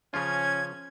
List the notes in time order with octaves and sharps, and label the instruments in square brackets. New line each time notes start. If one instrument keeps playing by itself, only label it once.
[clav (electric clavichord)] C#3 F3 F4 [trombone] C#4 [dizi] G#6